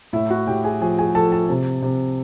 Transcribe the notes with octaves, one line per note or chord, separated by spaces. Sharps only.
A2 E4 E5
F#4 F#5
A2 G4 G5
G#4 G#5
F3 G#4 G#5
G#4 G#5
F3 A4 A5
A4 A5
C3
C3